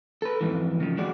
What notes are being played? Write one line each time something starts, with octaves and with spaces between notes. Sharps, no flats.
A4 B4
F2 G#2 E3
C#3 F3
D3 G#3 F#4 D5